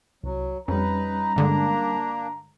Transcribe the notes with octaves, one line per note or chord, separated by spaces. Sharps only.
C2 F#3
F2 G3 C#4 D#4 B4 A#5
G2 D3 G#3 A#3 D4